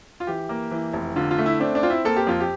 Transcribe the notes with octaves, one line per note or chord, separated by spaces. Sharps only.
F4
E3 G4
A#3
E3
F1
D3 F4
F4
A3
E4
C4 D4
D4
C4 F4
E4
A#3 A4
G4
F2 F4
G4